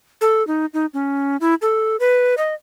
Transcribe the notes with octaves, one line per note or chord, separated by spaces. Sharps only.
A4
D#4
D#4
C#4
E4
A4
B4
D#5